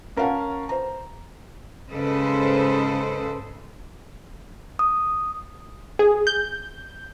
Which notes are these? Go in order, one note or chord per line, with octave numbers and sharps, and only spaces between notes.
C#4 A#4 C#5 F5 F#5 A5
C5 A#5
G#2 C#3 A4 B4 C5 D#5
D#6
G#4
G6